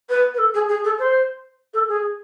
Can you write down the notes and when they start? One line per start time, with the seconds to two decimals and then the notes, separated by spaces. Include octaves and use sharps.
0.09 B4
0.34 B4
0.38 A4
0.54 G#4
0.69 G#4
0.84 A4
0.99 C5
1.73 A4
1.88 G#4